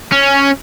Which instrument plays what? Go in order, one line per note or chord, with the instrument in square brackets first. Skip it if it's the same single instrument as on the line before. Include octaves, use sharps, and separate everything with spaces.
[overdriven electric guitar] C#4